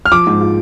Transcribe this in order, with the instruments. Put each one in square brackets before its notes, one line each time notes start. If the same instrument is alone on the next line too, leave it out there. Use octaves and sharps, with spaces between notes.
[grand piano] F6
[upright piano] F3 [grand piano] D6
[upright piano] G#2
F4